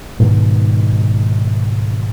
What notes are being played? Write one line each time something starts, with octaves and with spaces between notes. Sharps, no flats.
G#2 B2 D#3 G#3